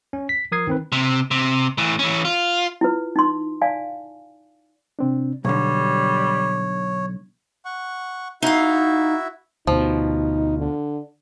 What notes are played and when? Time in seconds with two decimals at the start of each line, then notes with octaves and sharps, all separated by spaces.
0.13 C#4
0.29 B6
0.52 F3 A#4 D#6 G#6 C7
0.67 D#3 C4 B4
0.92 C3
1.31 C3
1.78 A2 E3
1.99 E3 C#4
2.25 F4
2.81 E4 F4 B4
3.16 D#4 C6
3.61 D5 F5 G#5 A5
4.99 C3 C4 D4
5.45 B1 B2 D3 G3 C#5
7.65 F#5 C#6
8.42 D#4 E4 F#4 E5 F5
9.67 D2 B2 F3 D#4
10.59 D3